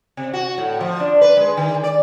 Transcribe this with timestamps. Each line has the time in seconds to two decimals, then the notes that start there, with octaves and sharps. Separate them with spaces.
0.17 C3
0.33 F#4
0.58 A2
0.81 F3
1.00 D4
1.21 B4
1.37 G#3
1.57 D#3
1.84 D5